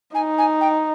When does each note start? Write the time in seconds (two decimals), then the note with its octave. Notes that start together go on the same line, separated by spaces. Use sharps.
0.15 D#4 G#5
0.38 G#5
0.61 G5